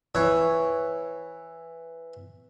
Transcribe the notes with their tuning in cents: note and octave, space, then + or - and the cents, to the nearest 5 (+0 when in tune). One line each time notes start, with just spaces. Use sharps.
E3 +0 C#5 +0